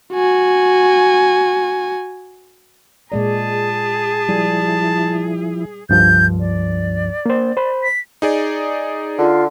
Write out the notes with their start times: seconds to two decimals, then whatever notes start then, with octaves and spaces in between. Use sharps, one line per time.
0.13 F#4 G#5
3.12 A#2 G#3 G#4 D5 A5
4.29 F3 G3 E4
5.89 C#2 G2 F3 G6
6.39 D5
7.26 A#3 C5
7.57 C5 B5
7.83 B6
8.22 D#4 G#4 D5
9.18 D3 F4